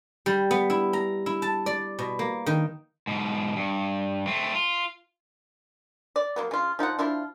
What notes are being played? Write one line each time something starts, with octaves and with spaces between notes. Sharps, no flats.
G3
B3
E4
A#5
E4
A5
D5
B2
A#3
D#3
G#2 B2
G2
A3 C4
F4
D5
F#3 A#3 B3
C#3 F4
F3 D#4 F4 F#5
F3 D4 E4 F4